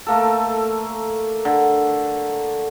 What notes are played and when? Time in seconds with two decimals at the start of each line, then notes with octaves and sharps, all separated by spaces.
0.07 A3 A#3 A4
1.45 D3